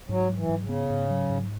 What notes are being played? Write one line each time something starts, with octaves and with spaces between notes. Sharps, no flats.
G#2 F#3
F#3
E3
G#2
C#3
B3
G#2
F#3
G#2